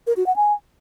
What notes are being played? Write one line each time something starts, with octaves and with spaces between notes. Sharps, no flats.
A#4
F#4
F#5
G#5